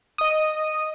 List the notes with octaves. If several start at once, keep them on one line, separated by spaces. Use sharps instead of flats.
D#5 D#6